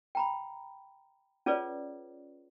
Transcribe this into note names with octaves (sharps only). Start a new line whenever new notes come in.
G5 A#5 B5
C#4 F4 G#4 B4 C#5 D5